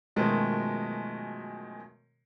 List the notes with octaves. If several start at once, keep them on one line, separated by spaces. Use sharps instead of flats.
F#2 B2 D#3 F3 G#3 A3